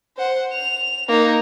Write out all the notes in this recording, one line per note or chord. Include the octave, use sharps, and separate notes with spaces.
C5 F#5
F7
A#3 D#4